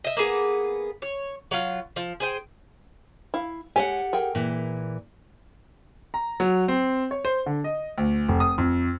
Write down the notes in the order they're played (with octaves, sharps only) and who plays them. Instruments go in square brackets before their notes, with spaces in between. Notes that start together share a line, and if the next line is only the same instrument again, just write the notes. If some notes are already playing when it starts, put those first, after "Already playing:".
[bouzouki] D#5 E5
A#3 B3 G#4
C#5
F#3 F4
F3
G#4 C5 G5
[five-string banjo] E4 F5
[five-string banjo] G#3 C#5 G#5 [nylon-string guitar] G4 A4 F#5
[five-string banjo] G#4 A#4 G5
[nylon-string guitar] A#2 E3
[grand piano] A#5
F#3
C4
C#5
C5
D3
D#5
D2
F1
D#6
F2